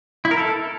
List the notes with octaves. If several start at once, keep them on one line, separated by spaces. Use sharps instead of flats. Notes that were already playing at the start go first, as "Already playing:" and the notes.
E4
A#4
A4